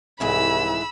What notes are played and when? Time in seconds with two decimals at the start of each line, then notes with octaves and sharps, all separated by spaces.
0.20 C2 F2 G#2 E3 B5 E6